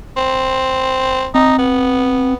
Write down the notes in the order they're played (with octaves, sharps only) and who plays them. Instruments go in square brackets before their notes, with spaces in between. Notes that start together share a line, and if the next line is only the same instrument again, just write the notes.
[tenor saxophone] C4
[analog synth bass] C4 [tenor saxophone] D#4
[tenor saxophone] B3